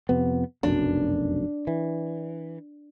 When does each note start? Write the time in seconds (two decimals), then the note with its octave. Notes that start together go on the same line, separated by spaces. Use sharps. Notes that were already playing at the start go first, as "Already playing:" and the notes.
0.09 F2 C3 B3
0.63 F1 B1 F#2 D4
1.67 E3